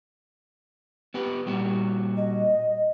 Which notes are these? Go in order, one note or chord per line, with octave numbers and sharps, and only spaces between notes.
B3 G4 B4
A#2 G3 F#4
D#5